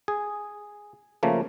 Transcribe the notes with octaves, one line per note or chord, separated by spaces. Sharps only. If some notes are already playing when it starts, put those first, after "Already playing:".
G#4
C#3 F3 A3 A#3